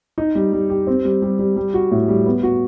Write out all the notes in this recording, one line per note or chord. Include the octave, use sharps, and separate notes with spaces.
D#4
G3
G3
G4
C4
G3
G3
G3
G3
F#4
A2
G3
B3
F#4